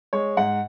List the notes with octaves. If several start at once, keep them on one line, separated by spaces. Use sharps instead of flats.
G#3 C#5
G#2 F#5